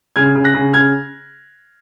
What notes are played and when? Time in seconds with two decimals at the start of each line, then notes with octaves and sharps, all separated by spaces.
0.16 C#3 F6 G#6
0.35 C#3
0.44 F#6 A#6
0.54 C#3
0.73 C#3 F6 G#6